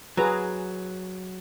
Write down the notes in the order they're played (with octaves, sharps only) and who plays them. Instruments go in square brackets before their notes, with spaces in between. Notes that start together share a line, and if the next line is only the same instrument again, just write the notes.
[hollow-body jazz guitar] F#3 [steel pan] G#4 B4 A#5